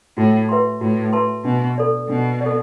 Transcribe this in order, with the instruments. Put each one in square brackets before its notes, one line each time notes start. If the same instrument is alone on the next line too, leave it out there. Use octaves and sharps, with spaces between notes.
[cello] A2 [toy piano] F#4
[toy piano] B4 E5 A5 C6
[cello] A2 [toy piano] F#4
[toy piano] B4 E5 A5 C6
[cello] B2 [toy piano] D4
[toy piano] A4 D5
[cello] B2 [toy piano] D4
[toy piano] D5
A4